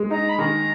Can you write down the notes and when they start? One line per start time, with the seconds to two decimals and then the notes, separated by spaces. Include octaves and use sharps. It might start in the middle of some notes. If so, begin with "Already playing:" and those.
Already playing: G#3
0.10 D#4 A#5
0.29 B5
0.38 D#3 A#5